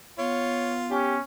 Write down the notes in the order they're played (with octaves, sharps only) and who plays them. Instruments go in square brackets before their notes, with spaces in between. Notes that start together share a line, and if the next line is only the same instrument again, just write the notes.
[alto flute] B3 [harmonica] F4 [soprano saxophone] C#5
[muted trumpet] C#4 [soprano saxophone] G4